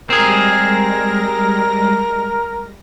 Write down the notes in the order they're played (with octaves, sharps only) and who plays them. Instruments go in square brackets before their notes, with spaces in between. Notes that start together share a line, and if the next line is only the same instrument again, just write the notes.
[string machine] G3 G#3 A#6 [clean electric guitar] C4 G#4 [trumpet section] A#4